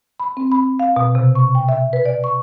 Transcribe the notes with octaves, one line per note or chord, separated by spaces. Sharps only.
B5
C4
B5
F5
B2
C3
C#6
G5
E5
B4
D5
C#6